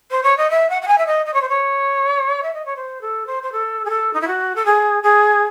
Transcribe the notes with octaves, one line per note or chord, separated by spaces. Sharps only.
C5
C#5
D#5
E5
F#5
F#5
G#5
E5
D#5
D#5
C#5
C5
C#5
E5
D#5
C#5
C5
A4
C5
C5
A4
G#4
A4
D#4
E4
F#4
A4
G#4
G#4